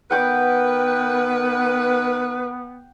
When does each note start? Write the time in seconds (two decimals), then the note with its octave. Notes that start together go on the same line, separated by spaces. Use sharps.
0.11 D#3 B3 A#4 B4 F#5 G5 D6